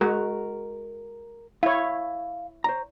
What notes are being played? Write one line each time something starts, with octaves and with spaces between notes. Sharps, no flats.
G#3 F#4 A#4
E4 C#5 F5
C5 C#5 A#5